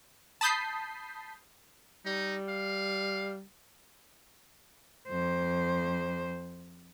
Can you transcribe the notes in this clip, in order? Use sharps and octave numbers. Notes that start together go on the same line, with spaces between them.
A5 B5 D#6 G6 B6 C7
G3 D#4
F5
F2 C5